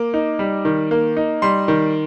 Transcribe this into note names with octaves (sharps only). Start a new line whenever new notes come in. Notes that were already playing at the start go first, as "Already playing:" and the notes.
Already playing: A#3 D6
D#4
G3
D#3
A#3
D#4
G3 C6
D#3